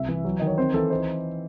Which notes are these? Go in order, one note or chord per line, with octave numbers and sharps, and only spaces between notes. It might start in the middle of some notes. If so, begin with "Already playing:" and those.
Already playing: C2 E5
E3
F#3
D#3 D#5
C#5
C4 C5
E3 A4
D#4 C5